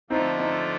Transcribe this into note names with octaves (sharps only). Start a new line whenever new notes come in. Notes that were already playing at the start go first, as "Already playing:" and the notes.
D3 F3 A3 C4 D4 D#4 F4
C4 D#4